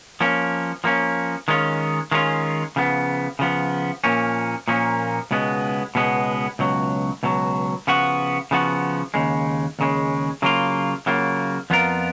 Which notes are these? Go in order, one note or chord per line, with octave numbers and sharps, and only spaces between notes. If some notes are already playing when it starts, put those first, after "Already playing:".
F3 A#3 C#4
F3 A#3 C#4
D#3 G#3 C#4 F4
D#3 G#3 C#4 F4
C#3 F3 B3
C#3 F3 B3
A#2 F3 A#3 C#4
A#2 F3 A#3 C#4
C#2 B2 G#3 B3
C#2 B2 G#3 B3
C#2 B2 F#3
C#2 B2 F#3
C#3 F3 B3 F#4
C#3 F3 B3 F#4
D#2 C#3 G#3
D#2 C#3 G#3
C#3 F#3 A#3 F4
C#3 F#3 A#3 F4
F2 F3 B3 F4 A#4